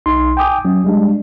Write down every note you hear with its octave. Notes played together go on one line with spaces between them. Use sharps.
B1 D#4 C6
G5 G#5 D6 D#6
F#3 C#4
G3 G#3 D4